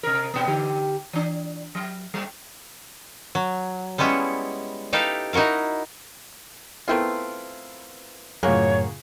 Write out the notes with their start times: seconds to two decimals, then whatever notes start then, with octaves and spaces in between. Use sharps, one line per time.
0.03 C3 A#4
0.34 B2 B3
0.47 D3 G4
1.13 E3 D4
1.75 F#3
2.14 G3
3.35 F#3
3.98 G3 G#3 B3 C#4 E4
4.93 D#4 E4 G4 A4 B4 F5
5.33 D#4 E4 F#4 A#4 F5
6.88 A3 B3 C4 E4 F4 A#4
8.43 F#2 A2 C#3 A#3 F4 F#4 G#4 C#5